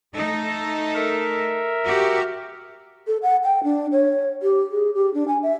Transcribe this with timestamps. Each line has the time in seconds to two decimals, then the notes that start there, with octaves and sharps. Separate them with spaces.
0.15 A3 D#4 A4
0.95 A#4 E5
1.85 F#4 G4
3.07 A4
3.22 F#5
3.44 G5
3.64 D4
3.92 C#5
4.43 G4
4.71 G#4
4.95 G4
5.14 D4
5.28 G#5
5.43 E5